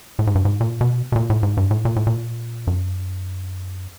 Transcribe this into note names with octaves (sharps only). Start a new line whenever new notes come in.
A2
G#2
G2
G#2
A#2
B2
B2
A#2
A2
G#2
G2
A2
A#2
A2
A#2
F#2